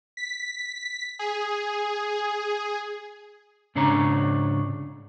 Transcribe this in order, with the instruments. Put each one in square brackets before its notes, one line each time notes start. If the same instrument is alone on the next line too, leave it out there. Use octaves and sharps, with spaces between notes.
[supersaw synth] B6
G#4
[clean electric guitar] G#2 C#3 D4 C#5 A#5